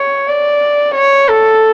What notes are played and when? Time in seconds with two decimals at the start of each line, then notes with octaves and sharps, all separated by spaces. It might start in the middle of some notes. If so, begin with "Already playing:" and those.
Already playing: C#5
0.29 D5
0.94 C#5
1.28 A4